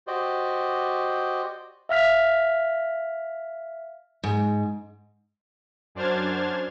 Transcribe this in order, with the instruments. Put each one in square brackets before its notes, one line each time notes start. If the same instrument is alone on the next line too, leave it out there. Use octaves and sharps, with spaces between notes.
[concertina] F#4 G4 C5 D5 D#5
[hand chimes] E5 F5 F6 B6
[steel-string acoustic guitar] G#2
[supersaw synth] F#2 D4 C5 F6 G#6 A6